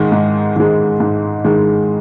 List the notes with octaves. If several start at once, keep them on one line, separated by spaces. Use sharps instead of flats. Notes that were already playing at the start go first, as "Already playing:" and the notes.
Already playing: G#2 D#3 G#3
G#2
D#3 G#3
G#2
D#3 G#3